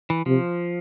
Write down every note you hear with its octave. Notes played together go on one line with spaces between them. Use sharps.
E3
C3 F3